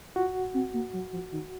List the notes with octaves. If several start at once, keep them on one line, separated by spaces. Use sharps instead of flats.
F4 F#4
C4
A#3
F#3
F3
D#3